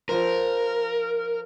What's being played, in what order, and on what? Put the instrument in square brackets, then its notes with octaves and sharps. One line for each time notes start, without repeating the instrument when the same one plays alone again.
[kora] F3 F4 C5 [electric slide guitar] A#4